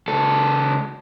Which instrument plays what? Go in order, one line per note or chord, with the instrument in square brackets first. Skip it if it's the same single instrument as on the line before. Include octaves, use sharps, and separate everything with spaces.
[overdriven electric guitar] C#2 A4